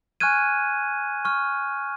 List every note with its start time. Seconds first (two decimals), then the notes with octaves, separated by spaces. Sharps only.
0.20 G#5 C#6 F6 F#6 G#6 D#7
1.25 C#6 F6